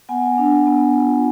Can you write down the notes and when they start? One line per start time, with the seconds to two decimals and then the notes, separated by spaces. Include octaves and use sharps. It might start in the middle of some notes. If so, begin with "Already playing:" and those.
0.09 B3 F#5 G#5
0.38 D4
0.67 B3
0.97 F4